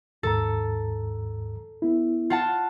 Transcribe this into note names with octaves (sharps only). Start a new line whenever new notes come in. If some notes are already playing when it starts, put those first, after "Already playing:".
D#2 G#2 A4 A#5
B3 E4
F4 F#5 A5